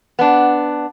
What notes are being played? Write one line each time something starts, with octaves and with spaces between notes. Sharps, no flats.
B3 D4